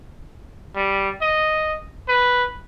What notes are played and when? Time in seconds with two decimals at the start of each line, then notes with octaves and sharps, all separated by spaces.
0.76 G3
1.21 D#5
2.08 B4